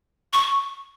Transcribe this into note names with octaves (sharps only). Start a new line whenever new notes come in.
C#6